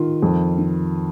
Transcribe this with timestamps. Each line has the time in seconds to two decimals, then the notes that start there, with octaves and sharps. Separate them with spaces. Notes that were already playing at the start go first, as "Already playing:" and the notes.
Already playing: D#3 F4
0.22 F2
0.58 D#3